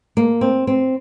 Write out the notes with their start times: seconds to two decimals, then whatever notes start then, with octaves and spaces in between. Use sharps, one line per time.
0.17 A#3
0.41 C4
0.67 C4